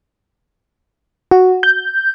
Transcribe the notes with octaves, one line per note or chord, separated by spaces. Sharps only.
F#4
G6